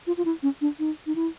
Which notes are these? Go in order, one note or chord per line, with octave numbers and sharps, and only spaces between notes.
F4
F4
E4
C#4
D4
D#4
D#4
E4